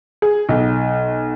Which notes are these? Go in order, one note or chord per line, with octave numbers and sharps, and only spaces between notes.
G#4
B1